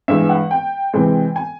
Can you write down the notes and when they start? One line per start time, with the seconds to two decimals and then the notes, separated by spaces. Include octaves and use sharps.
0.08 G2 E3 G#3 E5
0.29 F#5
0.51 G5
0.94 C3 E3 G#3
1.36 G#5